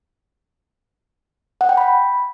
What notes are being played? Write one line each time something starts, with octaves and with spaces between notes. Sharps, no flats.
F#5
G5
B5